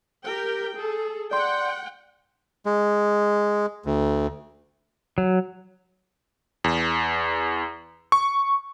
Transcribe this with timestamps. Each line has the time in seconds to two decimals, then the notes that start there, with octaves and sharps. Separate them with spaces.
0.24 G4 A#4 G5
0.76 G#4 A4
1.31 D5 F#5 G5 C6
2.66 G#3
3.86 D2
5.18 F#3
6.64 E2
8.12 C#6